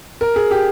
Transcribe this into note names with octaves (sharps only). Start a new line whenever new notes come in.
A#4
G#4
G4